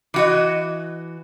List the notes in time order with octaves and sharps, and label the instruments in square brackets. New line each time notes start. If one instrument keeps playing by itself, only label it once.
[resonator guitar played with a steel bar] E3 F#4 D#5